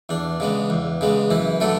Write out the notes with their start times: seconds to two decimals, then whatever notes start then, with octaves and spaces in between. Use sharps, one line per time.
0.09 E2 D4
0.40 C#3 G#3 B3
0.70 E2
1.01 C#3 G#3 B3
1.30 F#2 E3 E4
1.60 D3 F#3 A3 A4